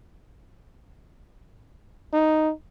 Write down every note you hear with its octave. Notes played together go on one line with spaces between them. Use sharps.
D#4